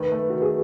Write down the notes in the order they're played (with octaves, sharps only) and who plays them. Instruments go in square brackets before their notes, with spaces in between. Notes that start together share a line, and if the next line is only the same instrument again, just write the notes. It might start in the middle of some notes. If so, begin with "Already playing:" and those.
Already playing: [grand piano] D#3 A3 [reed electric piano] B4
[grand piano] A3
[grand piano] D#3 [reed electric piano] F#4
[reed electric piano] G#4